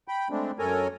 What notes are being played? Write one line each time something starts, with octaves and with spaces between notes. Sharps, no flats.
G5 B5
G#3 A3 C4 D4
F#2 A4 A#4 C#5 G#5 A#5